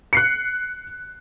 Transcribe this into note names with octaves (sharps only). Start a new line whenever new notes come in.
F#6 C7 C#7